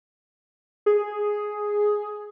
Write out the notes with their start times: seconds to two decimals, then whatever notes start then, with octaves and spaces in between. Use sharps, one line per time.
0.86 G#4